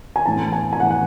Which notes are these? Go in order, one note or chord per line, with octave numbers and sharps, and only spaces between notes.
G#5
A2 E3 B3 E4 A5
G#5
G#5
A2 E3 B3 E4 F#5
F#5